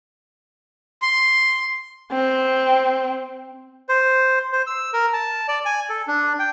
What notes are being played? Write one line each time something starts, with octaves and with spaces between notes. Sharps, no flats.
C6
C4
C5
C5
E6
A#4
A5
D5
G#5
A4
D4
G5